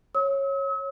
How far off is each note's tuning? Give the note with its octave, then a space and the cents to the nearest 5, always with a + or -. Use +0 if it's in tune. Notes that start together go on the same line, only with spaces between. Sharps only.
C#5 -15 E6 -45